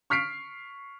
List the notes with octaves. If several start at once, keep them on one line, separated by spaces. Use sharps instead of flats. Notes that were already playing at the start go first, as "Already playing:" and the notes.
C#6 F6 B6 C7 D7